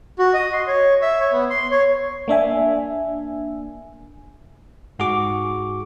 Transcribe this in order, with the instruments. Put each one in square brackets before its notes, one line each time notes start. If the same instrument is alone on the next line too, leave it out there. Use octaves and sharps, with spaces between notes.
[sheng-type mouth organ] F#4
D#5
C6
C#5
E5
C#5
B3
C6
C#5
[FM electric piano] A#3 D4 E5 G#5
[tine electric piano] G#2 F#4 G#4 C#6 D6